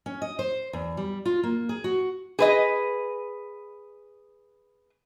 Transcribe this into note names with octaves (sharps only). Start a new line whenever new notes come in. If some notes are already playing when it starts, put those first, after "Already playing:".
C#4
D#5
C5
E2
G3
F4
A#3
G#4
F#4
G#4 B4 D#5